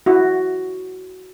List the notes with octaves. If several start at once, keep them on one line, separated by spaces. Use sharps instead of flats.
E4 F#4